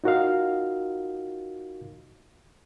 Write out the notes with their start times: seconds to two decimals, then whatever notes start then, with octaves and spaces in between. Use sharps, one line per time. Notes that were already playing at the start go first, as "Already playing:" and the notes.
0.04 D#4 F4 F#4 A#4 D#5 F5